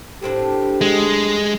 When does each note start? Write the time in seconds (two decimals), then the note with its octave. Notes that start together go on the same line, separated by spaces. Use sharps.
0.22 A2 C4 D4 G4
0.81 G#3